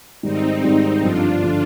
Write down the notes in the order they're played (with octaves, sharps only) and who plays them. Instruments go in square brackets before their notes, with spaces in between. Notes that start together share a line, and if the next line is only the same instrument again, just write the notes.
[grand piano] G#2 D#3 G3 [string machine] C4 D#4
[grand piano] G#2 D#3 G3 [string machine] C4 D#4
[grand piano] G1 G2 D3 F3 [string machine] D4 F4
[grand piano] D3 F3